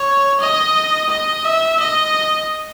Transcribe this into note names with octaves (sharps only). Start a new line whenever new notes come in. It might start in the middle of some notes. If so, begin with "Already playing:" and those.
Already playing: C#5
D#5
D#5
E5
D#5